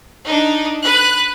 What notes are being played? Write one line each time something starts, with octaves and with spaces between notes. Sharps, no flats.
D4 D#4
B4 F#6